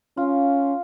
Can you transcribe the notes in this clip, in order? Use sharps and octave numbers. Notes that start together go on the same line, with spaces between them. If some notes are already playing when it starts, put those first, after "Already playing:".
C#4 F4